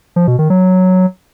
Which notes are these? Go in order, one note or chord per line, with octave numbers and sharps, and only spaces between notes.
F3
B2
D#3
F#3